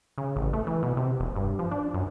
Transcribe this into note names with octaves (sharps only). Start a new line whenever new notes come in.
C#3
A1
A3
E3
B2
C3
E1
G2
F3
D4
F#2